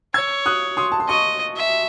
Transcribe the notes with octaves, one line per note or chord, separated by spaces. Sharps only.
C#5 E6 G#6
D#6 F#6
C6 D#6
A5
C6
D#5 A5 C#6
E5